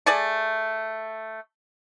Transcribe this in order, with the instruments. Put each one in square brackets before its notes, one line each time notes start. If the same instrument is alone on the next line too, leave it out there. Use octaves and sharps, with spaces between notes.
[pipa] A3 G#4 D5